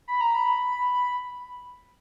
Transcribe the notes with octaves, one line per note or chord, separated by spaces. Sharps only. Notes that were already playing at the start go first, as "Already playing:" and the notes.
B5
A#5
B5